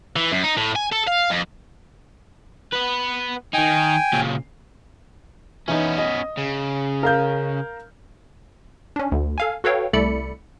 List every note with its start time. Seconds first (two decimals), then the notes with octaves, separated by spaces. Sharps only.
0.16 E3
0.32 F#2
0.44 D#4
0.58 A2
0.76 G#5
0.92 A4
1.08 F5
1.31 F2
2.72 B3 B4
3.54 D#3 D#4 G5 G#5
4.13 A#2 C#3
5.68 E3 B3 C#4 D#4
5.98 D#5
6.37 C#3
7.03 A#4 F5 G6
8.96 C#4 D4
9.12 D2 D3
9.38 A4 F5 G#5
9.64 F#4 A4 B4 C#5 F5 G5
9.93 C2 A3 A4 D5 B5 C#7